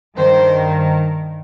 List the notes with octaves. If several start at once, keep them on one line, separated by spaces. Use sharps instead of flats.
G2 D#3 C5